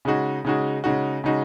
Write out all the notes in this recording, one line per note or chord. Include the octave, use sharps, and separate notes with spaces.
C#3 G#3 D#4 F#4
C#3 G#3 D#4 F#4
C#3 G#3 D#4 F#4
C#3 G#3 D#4 F#4